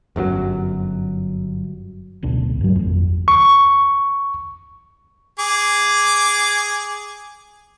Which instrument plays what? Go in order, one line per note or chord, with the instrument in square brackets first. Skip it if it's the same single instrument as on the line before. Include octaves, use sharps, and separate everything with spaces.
[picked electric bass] G1 F#2 D3 F#3
[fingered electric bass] D1 B1 D4
G2 F#3
G#1 F2
[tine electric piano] C#6
[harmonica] G#4 D6